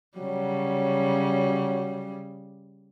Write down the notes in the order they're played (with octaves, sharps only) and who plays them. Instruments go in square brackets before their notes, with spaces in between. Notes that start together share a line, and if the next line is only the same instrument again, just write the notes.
[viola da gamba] C#3 G3 [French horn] F#3